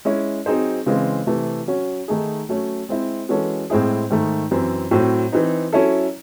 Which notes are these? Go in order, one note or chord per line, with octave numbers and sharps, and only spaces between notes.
G#3 C#4 E4
F#3 C4 D#4 G#4 C5
C#3 E3 G#3 C4
C3 E3 A3
F#3 C#4 F#4
D#3 A3 D#4 G#4
F#3 A3 C#4
G#3 C4 E4
E3 G#3 C#4 F#4 A4
A2 G#3 C4 E4 G#4
G#2 D#3 A3
F#2 E3 C4
A2 F#3 C4
E3 C4 D#4
F#3 C#4 E4 A4